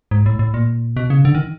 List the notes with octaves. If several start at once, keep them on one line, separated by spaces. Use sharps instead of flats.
G#2
A2
A2
A#2
B2
C#3
D3
D#3